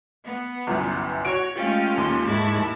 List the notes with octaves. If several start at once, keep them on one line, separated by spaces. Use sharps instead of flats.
B3
G1 C2 F#2
F#4 C#5 D7
G#3 A3 C#4 F4 G4 F5 G5
D#2 C6
G#2 G#3 E4 A#4 A5 C#6